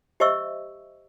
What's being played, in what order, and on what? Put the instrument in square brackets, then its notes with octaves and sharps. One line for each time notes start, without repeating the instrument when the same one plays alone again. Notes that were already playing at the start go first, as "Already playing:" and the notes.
[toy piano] G4 C5 D#5 E5 C#6 E6